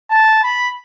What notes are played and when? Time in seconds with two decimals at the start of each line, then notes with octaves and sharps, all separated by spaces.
0.10 A5
0.44 B5